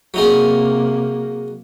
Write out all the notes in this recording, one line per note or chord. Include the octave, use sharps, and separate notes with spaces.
C3 F#3 A#3 D#4 G#4